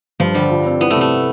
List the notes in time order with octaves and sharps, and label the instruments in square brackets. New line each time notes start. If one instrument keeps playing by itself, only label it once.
[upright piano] G2 [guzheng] F3
[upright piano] D3 [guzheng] G3
[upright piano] F3
C4
[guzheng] B3 [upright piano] E4
[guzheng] A3
[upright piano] C3
[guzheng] A3